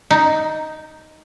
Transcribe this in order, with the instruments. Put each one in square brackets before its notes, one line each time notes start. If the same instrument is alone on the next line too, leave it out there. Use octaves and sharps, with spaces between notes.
[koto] D#4